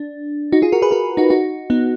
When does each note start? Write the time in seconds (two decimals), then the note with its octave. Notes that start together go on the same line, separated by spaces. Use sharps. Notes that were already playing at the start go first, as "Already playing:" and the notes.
Already playing: D4
0.52 D#4 F#4
0.62 F4 G#4
0.72 F#4 A#4
0.82 G#4 B4
0.91 F#4 A#4
1.17 D#4 F#4
1.30 D#4 F#4
1.70 B3 D#4